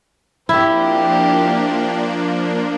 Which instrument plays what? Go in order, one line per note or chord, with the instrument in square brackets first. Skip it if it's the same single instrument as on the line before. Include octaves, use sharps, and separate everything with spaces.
[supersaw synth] F3 A#3 D4 [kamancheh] C4 G4 [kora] E4